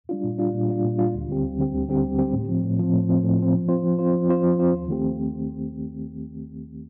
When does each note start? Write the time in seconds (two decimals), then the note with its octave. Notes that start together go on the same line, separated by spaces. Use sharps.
0.09 G3 D4 F4
0.24 A#2
0.38 G3 D4 F4
0.54 A#2
0.68 G3 D4 F4
0.84 A#2
0.99 G3 D4 F4
1.14 D2
1.28 D3 G3 C4 G4
1.44 D2
1.59 D3 G3 C4 G4
1.73 D2
1.89 D3 G3 C4 G4
2.04 D2
2.19 D3 G3 C4 G4
2.34 A2
2.49 F3 C4
2.63 A2
2.79 F3 C4
2.93 A2
3.09 F3 C4
3.24 A2
3.39 F3 C4
3.54 F3
3.68 C4 F4 C5
3.84 F3
3.99 C4 F4 C5
4.13 F3
4.29 C4 F4 C5
4.44 F3
4.58 C4 F4 C5
4.73 D#2
4.88 D#3 A3 C4 G4